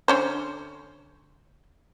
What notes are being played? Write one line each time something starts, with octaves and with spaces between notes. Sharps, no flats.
D3 C#4 C5